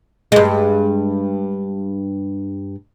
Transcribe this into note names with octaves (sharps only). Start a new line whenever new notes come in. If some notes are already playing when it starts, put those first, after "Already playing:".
G2 G#3